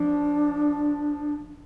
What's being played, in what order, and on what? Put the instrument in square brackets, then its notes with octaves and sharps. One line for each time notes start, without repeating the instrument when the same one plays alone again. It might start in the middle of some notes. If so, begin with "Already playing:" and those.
Already playing: [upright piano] F3 [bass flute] D4